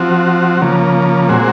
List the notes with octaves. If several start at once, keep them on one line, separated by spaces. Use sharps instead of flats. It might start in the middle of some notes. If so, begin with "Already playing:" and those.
Already playing: F3 C4 F#4
C#3 F3 A#3
A#2 G#3 C4 F#4